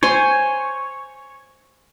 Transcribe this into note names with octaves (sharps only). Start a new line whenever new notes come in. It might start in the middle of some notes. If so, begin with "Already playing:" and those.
C5 C#5 G#5